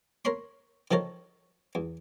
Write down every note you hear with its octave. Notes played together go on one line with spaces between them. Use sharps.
A#4 C#5 B5 C6
D#3 F3 A4 A#4 C#5
E2